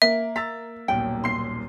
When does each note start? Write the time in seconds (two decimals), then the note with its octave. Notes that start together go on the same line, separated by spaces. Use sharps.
0.02 A#3 E5
0.36 A#5 E6 A6 B6
0.88 D#1 B1 A#2 G5
1.24 C6 C7